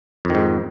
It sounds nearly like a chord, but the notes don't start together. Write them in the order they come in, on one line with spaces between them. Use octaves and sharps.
F2 D#3 G#2